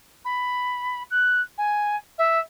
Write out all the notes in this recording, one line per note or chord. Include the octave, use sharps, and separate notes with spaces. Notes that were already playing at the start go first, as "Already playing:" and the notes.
B5
F#6
G#5
E5